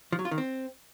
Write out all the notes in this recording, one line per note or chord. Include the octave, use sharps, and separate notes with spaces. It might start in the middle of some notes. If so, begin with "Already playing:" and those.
F3
F#3
F4
D#3
C4